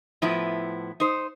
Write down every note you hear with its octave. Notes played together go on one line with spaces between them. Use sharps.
A2 F3 B3 E4
D#4 C5